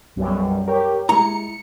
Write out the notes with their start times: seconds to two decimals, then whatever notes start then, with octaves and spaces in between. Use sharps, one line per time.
0.16 B1 F#2 G3
0.68 G4 A#4 C#5 G5
1.09 G#3 E4 A#5 C#7